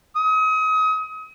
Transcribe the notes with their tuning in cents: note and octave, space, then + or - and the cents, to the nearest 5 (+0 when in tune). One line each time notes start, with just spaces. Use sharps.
D#6 +35